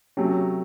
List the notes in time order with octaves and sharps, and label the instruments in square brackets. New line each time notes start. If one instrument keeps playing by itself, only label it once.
[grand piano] C3 F#3 A3 [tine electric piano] C#4